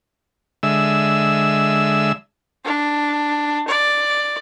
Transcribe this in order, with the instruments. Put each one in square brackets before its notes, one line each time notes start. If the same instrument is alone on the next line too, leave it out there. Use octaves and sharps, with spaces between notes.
[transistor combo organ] D3 G#3 E5 E6
[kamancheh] D4
D5